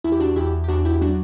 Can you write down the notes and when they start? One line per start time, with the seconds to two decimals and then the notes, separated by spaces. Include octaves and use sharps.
0.04 E2 E4
0.12 G4
0.20 D4 F#4
0.36 E2 E4 G4
0.64 G4
0.68 E2 D4 F#4
0.85 E4 G4
1.01 F#3 D4 F#4